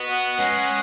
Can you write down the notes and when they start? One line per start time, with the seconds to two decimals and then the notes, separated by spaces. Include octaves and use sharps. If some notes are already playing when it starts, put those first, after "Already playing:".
Already playing: B3 F#4 B4 D#5
0.38 G#3 C#4 B4 D#5 F#5